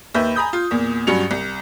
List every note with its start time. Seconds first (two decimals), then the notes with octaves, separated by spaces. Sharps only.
0.14 D#2 B4 E5 B5 G6
0.36 G#5 A#5 B5 D#6 G6
0.53 F4
0.71 E2 A#2
1.07 G2 F#3 C#4 C#7 F7
1.31 C2